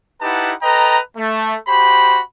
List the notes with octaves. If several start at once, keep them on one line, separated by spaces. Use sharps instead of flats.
D#4 E4 G4 B4 F#5 A5
A4 B4 D#5 G5 A#5
A3
F#4 G4 C5 B5